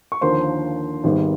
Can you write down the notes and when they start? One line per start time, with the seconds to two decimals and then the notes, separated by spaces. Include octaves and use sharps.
0.12 C#6
0.21 D#2 D3 F3 A#3 C5 C6
1.04 G#1 G#2 D#3 G3 B3